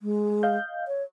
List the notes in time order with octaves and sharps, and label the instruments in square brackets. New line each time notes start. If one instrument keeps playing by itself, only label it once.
[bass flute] G#3
[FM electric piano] D#5 F5 G6
[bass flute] C#5